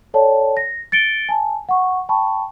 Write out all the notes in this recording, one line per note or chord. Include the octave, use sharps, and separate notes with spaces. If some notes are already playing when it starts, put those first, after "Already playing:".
A4 C#5 D5 G5 A5
A#6
A6 C#7 D7 G7
G#5 A5
F#5 C#6
G5 A5 B5 C#6